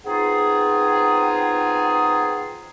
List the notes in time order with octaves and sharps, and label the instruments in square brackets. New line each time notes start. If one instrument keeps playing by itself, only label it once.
[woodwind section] B3 C4 D#4 F4 G#4